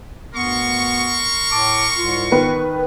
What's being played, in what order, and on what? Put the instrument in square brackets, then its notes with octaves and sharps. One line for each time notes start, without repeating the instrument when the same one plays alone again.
[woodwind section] D2 G2 B3 [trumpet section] A#4 C6 C#6
[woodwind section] A2 A5 D6
C2 G#2 F4
[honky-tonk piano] D#3 B3 B4